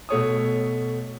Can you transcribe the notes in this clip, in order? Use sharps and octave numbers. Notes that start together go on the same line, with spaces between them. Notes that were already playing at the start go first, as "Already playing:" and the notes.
B2 A3 C#5 D#6